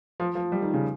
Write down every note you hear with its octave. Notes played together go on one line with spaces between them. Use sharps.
F3
F3
G3
D#3
C#3